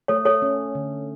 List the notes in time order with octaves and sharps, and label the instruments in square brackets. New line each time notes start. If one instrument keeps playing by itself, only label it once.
[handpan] A3 [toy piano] A4 C#5
[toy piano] A4 C#5
[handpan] C#4
D3